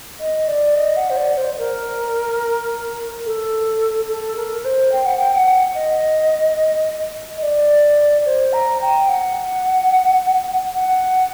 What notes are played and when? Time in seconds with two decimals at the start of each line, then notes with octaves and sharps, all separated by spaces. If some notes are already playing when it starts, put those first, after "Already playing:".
0.19 D#5
0.47 D5
0.75 D#5
0.96 F#5
1.10 C5
1.17 D5
1.37 C5
1.58 A#4
3.25 A4
4.08 A4
4.36 A#4
4.64 C5
4.92 G5
5.05 F#5
5.18 G5
5.33 F#5
5.74 D#5
7.37 D#5
7.42 D5
8.25 C5
8.52 A#5
8.81 G5
9.09 F#5
10.75 F#5